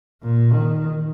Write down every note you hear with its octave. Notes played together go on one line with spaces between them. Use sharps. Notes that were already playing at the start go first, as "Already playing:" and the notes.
A#2
D#3